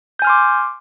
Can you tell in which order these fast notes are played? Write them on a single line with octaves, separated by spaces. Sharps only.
G6 G#5 F6 C6 D6